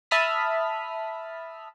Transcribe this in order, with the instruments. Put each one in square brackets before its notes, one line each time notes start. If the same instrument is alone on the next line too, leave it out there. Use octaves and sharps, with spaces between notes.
[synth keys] E5 A5 B5 D#6 F6 B6